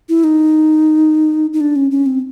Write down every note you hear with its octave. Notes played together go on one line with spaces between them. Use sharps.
E4
D#4
D#4
D4
C#4
C#4
C4